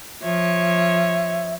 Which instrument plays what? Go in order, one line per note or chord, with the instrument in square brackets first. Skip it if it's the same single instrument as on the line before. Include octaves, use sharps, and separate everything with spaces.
[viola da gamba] F3 C#5 [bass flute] E5